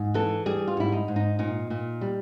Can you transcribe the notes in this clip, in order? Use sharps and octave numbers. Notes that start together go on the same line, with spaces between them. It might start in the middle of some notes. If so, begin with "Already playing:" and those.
Already playing: G#2
E3 A4
G3 G#4
F4
G#2 E4
D#4
G#2
D#4
A#2 D#4
A#2
G3